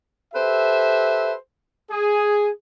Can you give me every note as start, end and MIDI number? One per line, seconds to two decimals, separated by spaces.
0.34 1.34 67
0.34 1.34 69
0.34 1.34 71
0.34 1.34 72
0.34 1.34 76
1.91 2.49 68